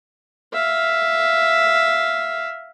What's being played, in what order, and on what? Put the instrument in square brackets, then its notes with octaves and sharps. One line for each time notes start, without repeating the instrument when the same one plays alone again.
[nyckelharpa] E5 F5